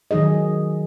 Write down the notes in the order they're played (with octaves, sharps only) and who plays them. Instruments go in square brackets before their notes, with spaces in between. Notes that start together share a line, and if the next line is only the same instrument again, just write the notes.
[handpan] D#3 F#3 D#4 G#4 D#5